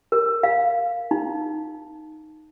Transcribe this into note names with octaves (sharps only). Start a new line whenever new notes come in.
A#4
F5
D#4